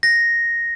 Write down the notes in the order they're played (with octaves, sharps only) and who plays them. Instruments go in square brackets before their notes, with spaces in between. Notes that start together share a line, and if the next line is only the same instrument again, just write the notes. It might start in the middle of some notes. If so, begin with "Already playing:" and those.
[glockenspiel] A#6